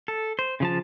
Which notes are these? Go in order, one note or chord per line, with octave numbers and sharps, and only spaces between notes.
A4
C5
C#3 F3 A5